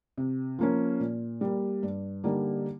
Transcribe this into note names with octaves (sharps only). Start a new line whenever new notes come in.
C3
F3 A#3 C#4
A#2
G3 A#3
G2
D3 G3 A#3 D#4